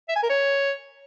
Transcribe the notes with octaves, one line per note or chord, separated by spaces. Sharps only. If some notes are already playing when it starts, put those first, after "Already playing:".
E5
G#5
A#4
C#5